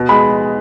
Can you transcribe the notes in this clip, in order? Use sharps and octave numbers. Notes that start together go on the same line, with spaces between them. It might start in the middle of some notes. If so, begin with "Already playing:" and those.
Already playing: B2
G#3 B5